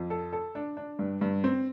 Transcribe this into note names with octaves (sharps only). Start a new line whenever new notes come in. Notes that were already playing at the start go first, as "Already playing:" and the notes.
Already playing: F2
A4
A4
D4
D4
G2
G2
C4